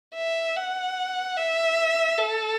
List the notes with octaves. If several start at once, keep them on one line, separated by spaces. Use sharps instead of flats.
E5
F#5
E5
A4